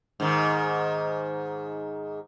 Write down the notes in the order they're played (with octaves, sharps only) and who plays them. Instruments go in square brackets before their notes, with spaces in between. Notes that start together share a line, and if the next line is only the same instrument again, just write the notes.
[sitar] G#2 D#3